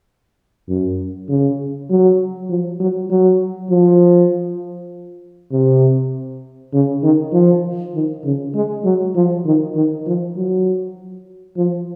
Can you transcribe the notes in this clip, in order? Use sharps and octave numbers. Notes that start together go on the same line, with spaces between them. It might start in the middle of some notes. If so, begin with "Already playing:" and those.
F#2
C#3
F#3
F3
F#3
F#3
F3
C3
C#3
D#3
F3
D#3
C#3
G#3
F#3
F3
D#3
D#3
F3
F#3
F3